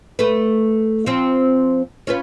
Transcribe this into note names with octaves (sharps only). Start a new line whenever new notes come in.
A3 B4
F3 C4
C#4 F4 B4